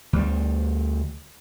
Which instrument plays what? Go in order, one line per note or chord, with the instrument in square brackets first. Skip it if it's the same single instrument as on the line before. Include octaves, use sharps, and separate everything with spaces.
[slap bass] D2 G3